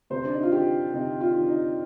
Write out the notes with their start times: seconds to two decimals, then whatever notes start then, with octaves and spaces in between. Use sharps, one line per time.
0.10 C3 C5
0.25 D4
0.33 D#4
0.43 F4
0.52 D#3 G4
0.93 C3 D#4
1.21 F4
1.35 D#3
1.49 D#4